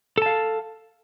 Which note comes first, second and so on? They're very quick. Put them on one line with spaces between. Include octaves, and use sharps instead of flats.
A4 A5 F5